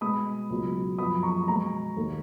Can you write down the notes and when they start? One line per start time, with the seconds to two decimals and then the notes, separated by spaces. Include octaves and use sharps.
0.01 B2 G#3 B3 B5 D#6
0.50 C#2 B2 F#3 B3
0.98 F#2 F3 B3 B5 D#6
1.23 A#5 C#6
1.47 B2 G#3 B3 A#5 C#6
1.97 D#2 D#3 A#3